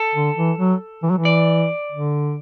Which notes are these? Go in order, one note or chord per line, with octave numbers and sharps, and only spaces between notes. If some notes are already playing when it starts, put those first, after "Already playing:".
Already playing: A4
D3
E3
F#3
E3
F#3
E3
D5
D3